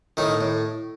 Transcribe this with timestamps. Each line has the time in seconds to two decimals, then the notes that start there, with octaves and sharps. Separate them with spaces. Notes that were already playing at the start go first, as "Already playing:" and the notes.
0.17 A2 D#3 D#4
0.41 A2